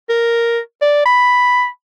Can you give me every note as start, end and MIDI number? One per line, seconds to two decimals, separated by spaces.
0.09 0.59 70
0.82 1.03 74
1.06 1.67 83